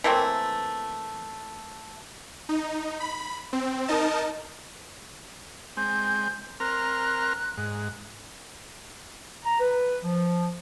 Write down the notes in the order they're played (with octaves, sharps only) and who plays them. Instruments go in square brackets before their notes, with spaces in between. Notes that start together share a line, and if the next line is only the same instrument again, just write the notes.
[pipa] E3 A3 A#3 C4
[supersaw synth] D#4
B5
C4
D#4 A#4 D#5 A5
[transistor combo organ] G#3 C4 [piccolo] G6
[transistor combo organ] C4 A#4 F6 [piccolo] F#6
[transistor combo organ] G#2
[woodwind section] A#5
B4
F3